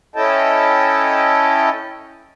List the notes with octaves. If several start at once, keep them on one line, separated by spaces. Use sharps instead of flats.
C#4 E4 A4 D#5 G5 A5